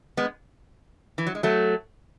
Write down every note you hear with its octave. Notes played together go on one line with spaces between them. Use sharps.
G#3 B3
E3
F#3
G#3
F#3 A3